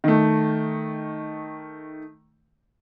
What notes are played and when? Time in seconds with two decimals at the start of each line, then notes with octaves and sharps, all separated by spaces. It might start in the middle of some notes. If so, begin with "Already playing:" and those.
0.04 D#3 A3